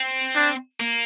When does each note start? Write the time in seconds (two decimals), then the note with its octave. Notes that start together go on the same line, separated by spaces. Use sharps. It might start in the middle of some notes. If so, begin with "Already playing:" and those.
Already playing: C4
0.36 D4
0.80 A#3